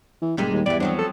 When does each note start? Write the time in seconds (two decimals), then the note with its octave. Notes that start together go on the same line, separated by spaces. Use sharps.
0.22 E3
0.37 F#1 A#2 G3 G#3
0.53 D#2
0.66 E2 E3 G3 D5
0.80 F3 F#3 C4 D4
0.99 A4